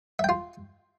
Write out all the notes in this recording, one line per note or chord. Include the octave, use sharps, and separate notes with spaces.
F4 E5 G5